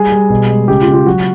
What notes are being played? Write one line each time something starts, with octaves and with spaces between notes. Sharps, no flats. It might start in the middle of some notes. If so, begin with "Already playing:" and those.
Already playing: G3 G#4
G3
B2
G#3
C#3 G4
F4
C#3
F4
F#3 F#4